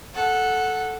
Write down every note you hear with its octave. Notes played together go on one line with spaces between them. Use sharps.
A4 F#5